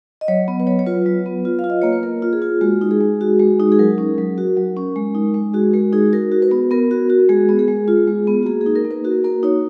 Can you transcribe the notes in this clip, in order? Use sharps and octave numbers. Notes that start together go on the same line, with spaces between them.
D#5
F#3 C#5
B3
B4
F#3 C#5
C#5
F4 B4
F#3
B3
F4
F5
F4
D#5
A#3 C#5
B4
A#3 A#4
F4
G#4
F4
G#3 F#4
D#4
G#4
G#3
F#4
G#3
D#4
G#4
F#3 A#4
C#4
F#3
F#4
F#3
C#4
G#3
D#4
G#3
F#4 G#4
G#3 A#4
D#4 G#4
F#4 A#4
F#4
B4
B3
B3 A#4
F#4
F#4
G#3 G#4
B3
G#4
G#3
F4
G#3
B3
F#4
A#3 G#4
G#4
D#4
A#4
A#3
B4
F#4 A#4
A#3 A#4
D#4 C#5